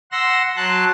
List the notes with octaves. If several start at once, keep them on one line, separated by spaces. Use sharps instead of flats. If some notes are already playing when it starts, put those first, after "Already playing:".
F#5 C6 E6 A#6
F#3 A5 C6 F#6